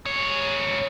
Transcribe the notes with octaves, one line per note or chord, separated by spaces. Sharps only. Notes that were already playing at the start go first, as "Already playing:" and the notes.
G#2 C#5